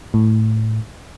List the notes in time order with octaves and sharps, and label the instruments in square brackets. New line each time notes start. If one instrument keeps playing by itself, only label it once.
[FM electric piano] A2